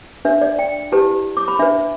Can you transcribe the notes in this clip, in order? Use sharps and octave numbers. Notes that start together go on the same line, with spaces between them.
D4 B4 E5
D5
G5
E4 G4 B4 A5
D6
B5
D4 B4 E5